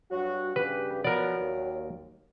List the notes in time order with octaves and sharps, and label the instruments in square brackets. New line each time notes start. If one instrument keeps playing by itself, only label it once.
[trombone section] G2 F#4 [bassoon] F#3
[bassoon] G2 [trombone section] C#3 G4 [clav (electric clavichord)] B4
[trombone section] F3 B3 [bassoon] F#3 [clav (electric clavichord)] A#4 D5
[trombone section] D#2